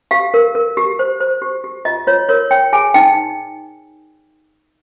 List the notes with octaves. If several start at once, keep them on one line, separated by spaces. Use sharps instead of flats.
G4 F5
A#4
A#4
G4
C5
C5
G4
G4
F4 D#5
F4 C#5
A#4 C#5
C#5 G5
G#4 G#5
D#4 G5